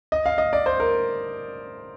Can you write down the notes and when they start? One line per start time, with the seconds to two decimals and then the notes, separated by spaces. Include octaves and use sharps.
0.12 D#5
0.26 F5
0.38 D#5
0.53 D5
0.66 C5
0.80 A#4